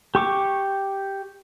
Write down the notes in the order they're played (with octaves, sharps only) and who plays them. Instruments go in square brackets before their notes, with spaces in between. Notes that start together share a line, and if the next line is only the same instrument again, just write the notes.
[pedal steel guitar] G4 C#6 D6